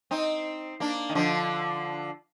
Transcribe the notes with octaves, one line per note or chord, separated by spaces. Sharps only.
C4 D#4
A#3 D4
D#3
D3 F3